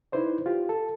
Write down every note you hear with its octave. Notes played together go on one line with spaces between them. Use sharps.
D#4 E4 B4 C5 D5
F4 G4
A4 A5